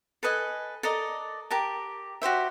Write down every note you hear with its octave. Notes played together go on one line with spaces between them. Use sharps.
A4 B4 D#5 G#5
A4 A#4 D5 D#5
G4 A#4 A5
F#4 G4 C5 E5